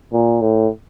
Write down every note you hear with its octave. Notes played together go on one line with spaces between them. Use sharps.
A#2
A2